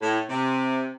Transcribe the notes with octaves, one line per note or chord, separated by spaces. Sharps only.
A2
C3